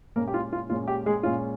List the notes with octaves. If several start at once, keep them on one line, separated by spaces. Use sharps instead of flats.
A#2 G#3 A#3 C#4 A#4
G4
F4
F4
A#2 G#3 C#4 F4
G4
G#3 G#4
A#2 G#3 C#4 F4